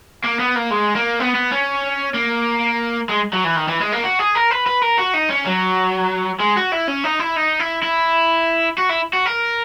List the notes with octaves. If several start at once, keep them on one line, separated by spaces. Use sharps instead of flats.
A#3
B3
A#3
G#3
A#3
B3
B3
C#4
A#3
G#3
F#3
E3
D#3
E3
G#3
A#3
F#4
G#4
A#4
B4
B4
A#4
F#4
D#4
C#4
F#3
G#3
F#4
E4
C#4
D#4
E4
D#4
E4
E4
F#4
E4
F#4
A#4